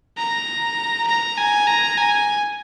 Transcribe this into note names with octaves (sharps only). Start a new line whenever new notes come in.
A#5
A#5
G#5
A#5
G#5